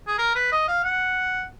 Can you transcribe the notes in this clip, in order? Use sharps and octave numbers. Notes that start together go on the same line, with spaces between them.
G#4
A#4
B4
D#5
F5
F#5